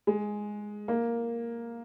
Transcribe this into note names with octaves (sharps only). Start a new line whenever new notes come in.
G#3
A#3